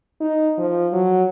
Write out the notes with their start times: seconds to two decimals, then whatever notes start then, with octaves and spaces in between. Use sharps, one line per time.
0.21 D#4
0.58 F3
0.93 F#3